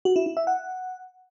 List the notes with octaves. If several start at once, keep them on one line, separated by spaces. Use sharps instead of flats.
F#4
E4
E4
E5
F#5